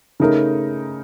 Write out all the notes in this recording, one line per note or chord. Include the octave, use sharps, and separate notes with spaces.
C#3 A3 D#4 A#4